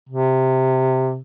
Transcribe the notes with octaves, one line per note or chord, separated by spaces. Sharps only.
C3